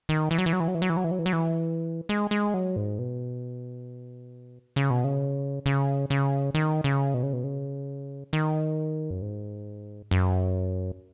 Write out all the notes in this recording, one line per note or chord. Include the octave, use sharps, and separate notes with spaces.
D#3
E3
F#3
E3
F#3
E3
F#3
E3
F#3
E3
F#3
E3
F#3
E3
F#3
E3
G#3
G#3
F#3
G#2
B2
C#3
B2
C#3
C#3
C#3
D#3
C#3
B2
C#3
B2
C#3
D#3
F#2
G#2
F#2